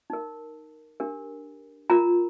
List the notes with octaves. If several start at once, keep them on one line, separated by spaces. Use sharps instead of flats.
D#4 A#4
D4 G4 A#4
F4 A#4 A#5